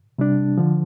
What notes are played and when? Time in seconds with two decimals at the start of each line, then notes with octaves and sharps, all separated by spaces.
0.18 C3 G3 D4
0.58 D3 F3